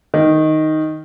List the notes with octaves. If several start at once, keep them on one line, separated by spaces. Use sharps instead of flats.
D#3